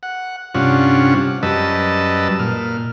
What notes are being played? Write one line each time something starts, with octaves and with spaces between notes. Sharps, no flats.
F#5
G2 C3 C#4 D4 F4 F#5
F#2 G3 B4 D#5 A5 E6
A#2 F6